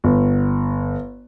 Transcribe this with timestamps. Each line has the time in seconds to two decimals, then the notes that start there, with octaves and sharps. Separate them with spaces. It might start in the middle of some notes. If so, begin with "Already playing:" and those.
0.04 G1